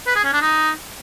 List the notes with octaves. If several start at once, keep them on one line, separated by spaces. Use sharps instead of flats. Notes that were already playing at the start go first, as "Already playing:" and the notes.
B4
G#4
C#4
D4
D#4